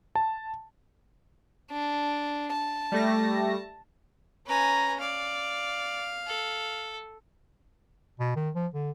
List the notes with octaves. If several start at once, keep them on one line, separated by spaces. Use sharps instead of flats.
A5
D4
A5
G3 A3 A#6
C#4 B4 G#5 A#5
D5 F5
A4
B2
D#3
F3
D3